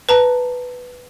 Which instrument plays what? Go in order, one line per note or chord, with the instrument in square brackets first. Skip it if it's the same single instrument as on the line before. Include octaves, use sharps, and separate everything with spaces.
[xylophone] B4 A5 A#5